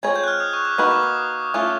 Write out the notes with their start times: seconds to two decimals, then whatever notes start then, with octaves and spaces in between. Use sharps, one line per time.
0.03 G#3 C4 F4 G#4 C#5 G#6
0.16 G6
0.24 F#6
0.28 F6
0.40 D#6
0.53 C#6
0.65 D6
0.78 A#3 D#4 F#4 B4 C#6
0.91 D6
1.03 D#6
1.54 A3 C#4 F4 C#6